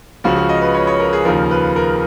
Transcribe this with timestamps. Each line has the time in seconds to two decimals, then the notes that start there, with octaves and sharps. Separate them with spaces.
0.24 C#2 C#3 F3 F#4
0.36 F#4
0.49 D#5
0.62 B4
0.74 C#5
0.87 C#5
1.00 A#4
1.13 G#4
1.25 D#2 C#3 F3 A#4
1.51 B4
1.76 A#4